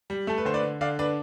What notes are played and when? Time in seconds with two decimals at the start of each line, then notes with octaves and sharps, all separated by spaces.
0.10 G3
0.27 A3 A4
0.38 B4
0.45 D3 C5
0.54 B4 D5
0.63 D3
0.81 D3 D5 F5
0.99 D4 B4 D5